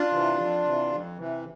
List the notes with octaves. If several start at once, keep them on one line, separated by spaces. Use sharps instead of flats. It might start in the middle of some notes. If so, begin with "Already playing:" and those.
Already playing: D4 F4
C3 E3
F2
C3 E3
F2
C3 E3